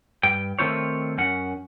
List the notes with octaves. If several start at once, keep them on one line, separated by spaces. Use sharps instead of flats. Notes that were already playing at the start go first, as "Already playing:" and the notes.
G2 G5
D#3 A3 C4 F4 C5 C#5
F#2 C#4 F#5